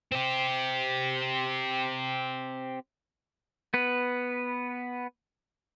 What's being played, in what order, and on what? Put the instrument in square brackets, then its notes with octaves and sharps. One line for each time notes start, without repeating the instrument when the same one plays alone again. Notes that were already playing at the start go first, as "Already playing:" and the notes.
[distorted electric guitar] C4 G4
[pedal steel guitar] B3 B4